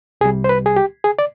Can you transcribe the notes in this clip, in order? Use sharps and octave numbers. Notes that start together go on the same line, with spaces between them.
C2 C3 G3 G#4
C5
B4
G#4
G4
G#4
D5